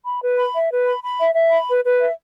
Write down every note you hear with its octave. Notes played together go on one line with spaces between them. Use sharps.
B5
B4
B5
E5
B4
B5
B5
E5
E5
B5
B4
B4
E5